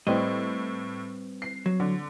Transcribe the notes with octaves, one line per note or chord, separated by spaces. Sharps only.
A2 G3 C4 B4 D#5
C7
F#3
D3